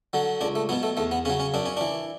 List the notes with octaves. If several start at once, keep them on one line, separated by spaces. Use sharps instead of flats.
D3 F#3
C#2 D4
A3
B2 F#3 B3
A3
E2 A3
B3
C#3 F#3 C#4
C#4
F#2 D4
C#4
E3 D4